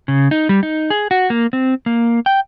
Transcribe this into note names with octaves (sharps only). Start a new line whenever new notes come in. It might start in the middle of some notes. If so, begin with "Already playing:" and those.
C#3
D#4
G3
D#4
G#4
F#4
A#3
C4
A#3
G5